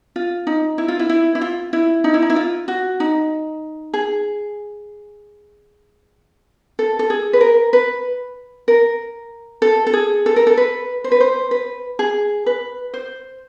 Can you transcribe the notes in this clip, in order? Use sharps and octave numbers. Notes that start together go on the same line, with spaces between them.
F4
D#4
E4
F4
E4
E4
E4
F4
E4
D#4
E4
D#4
E4
F4
F#4
D#4
G#4
A4
A4
G#4
B4
A#4
B4
A#4
A4
A4
G#4
A4
A#4
A4
B4
C5
B4
C5
B4
G#4
B4
C5